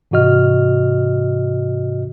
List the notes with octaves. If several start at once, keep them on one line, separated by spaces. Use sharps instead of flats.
G#2 C3 E3 F#4 D#5 F6